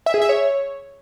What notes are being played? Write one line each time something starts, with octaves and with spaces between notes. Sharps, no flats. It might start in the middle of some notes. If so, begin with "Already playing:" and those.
E5
G#4
E5
C#5